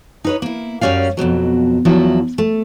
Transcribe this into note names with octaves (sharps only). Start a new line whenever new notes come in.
D#4 B4 C#5
A#3 E4
F#2 G3 C#4 D5 F5
F2 G#2 B2 F#3
E2 F3 F#3 E4
A3